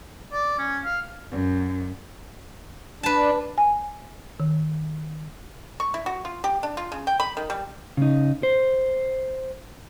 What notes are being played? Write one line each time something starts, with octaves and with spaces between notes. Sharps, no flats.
D5
C#4
F5
F#2
D4 B4 A5
G#5
D#3
C#6
E4
F#4
F4
G4
D4
F4
C#3
G5
B5
D#3
G3
C#3 D#4
C5